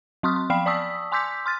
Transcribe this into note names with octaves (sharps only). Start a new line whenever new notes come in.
F#3 C4 C6 C#6 D#6 F6
C6
F3 F5 G5 B5 F6 C7
D5 A5 C#6 D#6 E6 B6
G#5 C6 D6 E6 G6 B6
C6 F6 A6